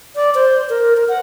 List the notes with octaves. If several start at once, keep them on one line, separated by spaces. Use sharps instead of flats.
D5
C5
A#4
A#4
F#5